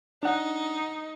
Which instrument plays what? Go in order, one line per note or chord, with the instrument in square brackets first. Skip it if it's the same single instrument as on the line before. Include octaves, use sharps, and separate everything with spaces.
[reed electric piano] D4 F#5 [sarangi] D#4